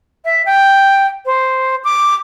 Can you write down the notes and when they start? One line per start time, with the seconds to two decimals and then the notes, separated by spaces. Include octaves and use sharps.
0.25 E5
0.46 G5
1.26 C5
1.84 D6